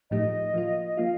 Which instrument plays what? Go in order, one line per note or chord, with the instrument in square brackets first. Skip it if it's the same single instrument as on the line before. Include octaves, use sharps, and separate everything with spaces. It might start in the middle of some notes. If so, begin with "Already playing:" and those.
[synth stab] A2 F3 A3 D#4 G4 [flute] D#5
[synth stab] F3 A#3 F4
[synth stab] F3 A#3 F4 [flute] F5